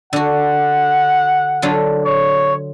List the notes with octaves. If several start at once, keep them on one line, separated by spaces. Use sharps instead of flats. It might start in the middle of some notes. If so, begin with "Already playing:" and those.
D3 F#4 F#5
D3 F#3 F4
C#5